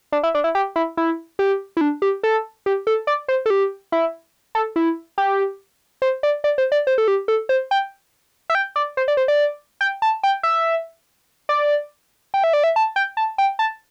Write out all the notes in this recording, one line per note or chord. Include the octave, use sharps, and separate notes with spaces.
D4
E4
D4
E4
G4
E4
E4
G4
E4
D4
G4
A4
G4
A4
D5
C5
A4
G4
E4
A4
E4
G4
C5
D5
D5
C5
D5
C5
A4
G4
A4
C5
G5
E5
G5
D5
C5
D5
C5
D5
G5
A5
G5
E5
D5
G5
E5
D5
E5
A5
G5
A5
G5
A5